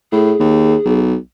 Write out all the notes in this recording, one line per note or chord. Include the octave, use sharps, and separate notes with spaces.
A2 G#4
D#2
B1